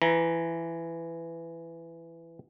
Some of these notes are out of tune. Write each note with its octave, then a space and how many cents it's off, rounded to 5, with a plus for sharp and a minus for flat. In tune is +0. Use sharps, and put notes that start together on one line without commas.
E3 +15 A#5 +30